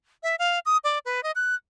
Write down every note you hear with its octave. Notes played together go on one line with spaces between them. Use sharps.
E5
F5
D#6
D5
B4
D#5
F#6